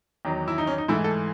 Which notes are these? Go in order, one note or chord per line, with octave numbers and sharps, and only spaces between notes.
E2 D#3 F#3
E4
D#4
C#4
D#4
G#2 E3 A3 E4
A4